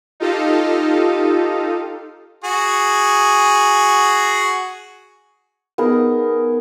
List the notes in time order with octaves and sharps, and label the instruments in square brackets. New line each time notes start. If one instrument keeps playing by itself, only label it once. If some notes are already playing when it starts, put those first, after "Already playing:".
[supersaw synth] D#4 F4 G4 A4 D#5 F5
[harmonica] F#4 G#4
[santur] B3 D#4 G#4 A#4